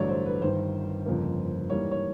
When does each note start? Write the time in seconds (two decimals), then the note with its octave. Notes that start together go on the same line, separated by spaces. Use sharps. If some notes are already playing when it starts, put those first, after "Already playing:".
Already playing: A1 G2 D3 F#3 A3 C#5 D5
0.09 C5
0.26 B4
0.41 G1 G2 D#3 C5
1.06 G1 F2 C#3 F3 A#3
1.70 G#2 E3 G3 A#3 C#5
1.91 C#5